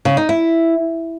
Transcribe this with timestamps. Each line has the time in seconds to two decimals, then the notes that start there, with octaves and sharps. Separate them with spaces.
0.05 C#3
0.17 D#4
0.29 E4